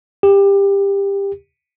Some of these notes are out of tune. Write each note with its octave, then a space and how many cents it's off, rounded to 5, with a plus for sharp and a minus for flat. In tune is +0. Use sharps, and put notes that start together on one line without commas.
G4 +20